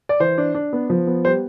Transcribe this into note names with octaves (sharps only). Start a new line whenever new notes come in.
D5
E3 C5
D4
D4
B3
F3
B3
G3 C5